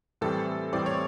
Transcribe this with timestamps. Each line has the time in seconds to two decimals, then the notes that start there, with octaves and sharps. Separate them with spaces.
0.21 A2 E3 G3 C4 A4
0.72 A2 E3 G3 C4 D5
0.86 C#5